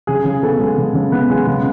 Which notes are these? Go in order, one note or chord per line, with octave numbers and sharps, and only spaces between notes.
C#3 G#4
C#3 G#4
B3 A4
G#3
C#3
C#3
B3
G#3
C#3